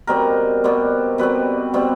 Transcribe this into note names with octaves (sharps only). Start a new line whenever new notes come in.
B2 G3 C4 A#4
B2 G3 C4
B2 G3 C4 B4
B2 G3 C4